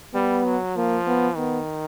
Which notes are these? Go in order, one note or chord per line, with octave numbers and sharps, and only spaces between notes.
G3 B3
F#3
F3 A#3
B3
D#3 B3